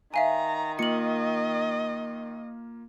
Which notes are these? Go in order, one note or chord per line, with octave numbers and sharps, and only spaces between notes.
D#3 E5 F5 G#5 A#5
A#3 F4 D#5 C#7 F#7